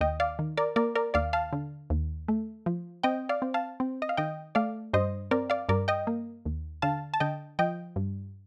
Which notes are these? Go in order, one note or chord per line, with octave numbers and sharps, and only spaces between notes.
D#2 D#5 G5
D5 F5
D#3
A#4 D5
A#3 A#4 D5
A#4 D5
D#2 D5 F5
F5 A5
D3
D#2
A3
F3
C4 D#5 G5
D5 F5
C4
F5 A5
C4
D#5
F5
D#3 D#5 G5
A3 D5 F5
G2 C5 D#5
C4 A#4 D5
D5 F5
G2 A#4 D5
D#5 G5
A#3
D#2
D3 F5 A5
A5
D3 D#5 G5
F3 D#5 G5
G2